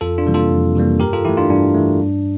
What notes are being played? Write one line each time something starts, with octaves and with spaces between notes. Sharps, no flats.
F2 F4 A4
D4 F4
C3 E3 G3 A#3
F4 A4
F2
C3 E3 G3 A#3
G2 G4 A#4
F4 A4
E3 A3 E4 G4
D4 F4
G2 D4
E3 A3
G2